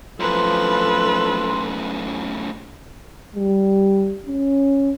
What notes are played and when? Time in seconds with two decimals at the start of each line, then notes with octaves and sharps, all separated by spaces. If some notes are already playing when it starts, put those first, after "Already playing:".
0.20 F#2 A2 F3 A4 B4 C6
3.35 G3
4.26 C#4